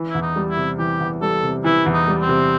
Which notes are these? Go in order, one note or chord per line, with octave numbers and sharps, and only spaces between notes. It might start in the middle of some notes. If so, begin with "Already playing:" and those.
Already playing: E3
E2 E4
D#4
G3
E4
C3
E3 G4
E2
G3 A4
C3
E3 E4
E2
D#4
G3
C4
C3